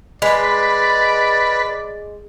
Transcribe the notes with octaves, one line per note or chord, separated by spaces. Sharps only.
G#3 B4 D5